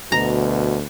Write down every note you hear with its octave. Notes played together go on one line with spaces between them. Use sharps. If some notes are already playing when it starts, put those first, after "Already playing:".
D2 B2 A#5